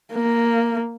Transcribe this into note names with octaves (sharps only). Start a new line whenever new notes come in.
A#3